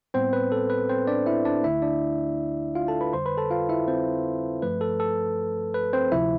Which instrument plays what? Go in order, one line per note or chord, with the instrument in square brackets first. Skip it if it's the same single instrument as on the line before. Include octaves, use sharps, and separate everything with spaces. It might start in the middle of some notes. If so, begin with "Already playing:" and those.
[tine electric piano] A2 G3 B3 C4 C5
B4
A4
B4
C4 C5
D4 D5
E4 E5
D4 D5
D2 D3 A3 E4 E5
D4 D5
F4 F5
A4 A5
B4 B5
F2 D3 G3 C5 C6
B4 B5
A4 A5
F4 F5
E4 E5
C4 C5
G2 F3 A3 B4
A4
A4
B4
C4 C5
D2 C3 F3 E4 E5